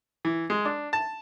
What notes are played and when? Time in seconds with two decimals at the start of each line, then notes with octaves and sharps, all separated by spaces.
0.25 E3
0.50 G#3
0.65 D4
0.93 A5